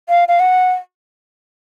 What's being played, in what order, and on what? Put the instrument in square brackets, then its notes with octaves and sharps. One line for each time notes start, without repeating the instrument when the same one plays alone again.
[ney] F5
F5
F#5